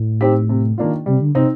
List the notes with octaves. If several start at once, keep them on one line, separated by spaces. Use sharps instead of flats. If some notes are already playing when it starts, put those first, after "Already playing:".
Already playing: A2
C4 D#4 G4
C3
D#3 A#3 D4 F4
C3 G3
D3
C3 C4 D#4